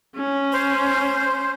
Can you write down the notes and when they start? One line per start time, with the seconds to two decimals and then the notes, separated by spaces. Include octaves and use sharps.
0.16 C#4
0.52 C5